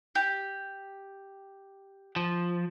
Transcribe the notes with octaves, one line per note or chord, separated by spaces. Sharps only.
G4
F3